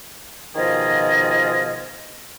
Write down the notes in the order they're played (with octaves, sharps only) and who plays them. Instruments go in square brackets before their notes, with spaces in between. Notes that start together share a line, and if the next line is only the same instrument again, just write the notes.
[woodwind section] B2 D#3 F3 F4 G#4 D#5